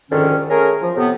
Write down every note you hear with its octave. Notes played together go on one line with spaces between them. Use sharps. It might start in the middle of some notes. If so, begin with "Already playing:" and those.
C2 F2 G#2 D3 D#3 C#4
A3 C#4 G#4 A#4
F3
A2 C3 B3